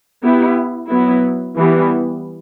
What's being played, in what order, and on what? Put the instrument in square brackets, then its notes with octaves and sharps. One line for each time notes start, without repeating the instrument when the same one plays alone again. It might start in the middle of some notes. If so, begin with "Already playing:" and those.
[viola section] B3 E4 G4
F#3 B3 E4
E3 G3 B3